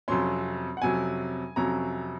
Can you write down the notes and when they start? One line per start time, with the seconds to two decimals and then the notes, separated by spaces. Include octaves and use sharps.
0.08 F2 C3 F#3 C#4 C6
0.77 F#5
0.82 F2 C3 F#3 C#4 G#5
1.56 F2 C3 F#3 C#4 A#5